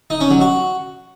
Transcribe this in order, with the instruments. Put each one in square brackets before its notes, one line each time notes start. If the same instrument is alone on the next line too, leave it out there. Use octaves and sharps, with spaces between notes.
[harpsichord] D#4
C#4
F#3
F#4